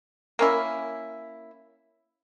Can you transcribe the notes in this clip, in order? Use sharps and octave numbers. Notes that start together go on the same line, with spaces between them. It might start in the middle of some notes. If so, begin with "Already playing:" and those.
A#3 C#4 E4